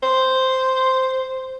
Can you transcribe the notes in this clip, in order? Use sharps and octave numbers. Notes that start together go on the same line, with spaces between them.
C5